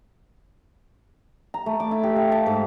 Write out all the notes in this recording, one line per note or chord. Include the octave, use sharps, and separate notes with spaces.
A#5
A3
D6
E4
G4
F5
A5
G#2